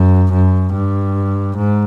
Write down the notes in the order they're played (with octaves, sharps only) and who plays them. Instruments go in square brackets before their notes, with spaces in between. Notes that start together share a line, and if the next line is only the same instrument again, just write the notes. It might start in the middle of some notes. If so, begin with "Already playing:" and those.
Already playing: [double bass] F#2
F#2
G2
G#2